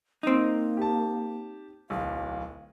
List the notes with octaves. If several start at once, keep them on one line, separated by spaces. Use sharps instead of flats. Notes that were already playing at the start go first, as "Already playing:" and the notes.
A#3 C4 D#4
G4 A5
D1 B1 F5